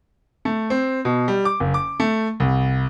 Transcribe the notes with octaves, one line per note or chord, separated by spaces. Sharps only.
A3
C4
B2
G3
D6
F#1
D6
A3
C2